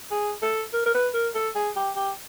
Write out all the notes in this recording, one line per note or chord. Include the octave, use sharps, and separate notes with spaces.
G#4
A4
A#4
A#4
B4
A#4
A4
G#4
G4
G4